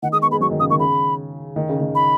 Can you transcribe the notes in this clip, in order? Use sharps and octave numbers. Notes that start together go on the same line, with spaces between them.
D#3 F#5
G#3 D#6
B3 C#6
G#3 B5
F#3 C#6
D#3
C#3 D#6
D#3 C#6
C#3 B5
D#3
C#3
D#3
B5